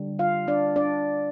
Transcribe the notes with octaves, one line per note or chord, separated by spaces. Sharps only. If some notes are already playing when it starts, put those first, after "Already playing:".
Already playing: D3 G3
F4 F5
D4 D5
D4 D5